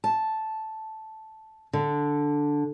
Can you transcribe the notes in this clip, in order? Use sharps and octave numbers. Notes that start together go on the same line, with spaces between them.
A5
D3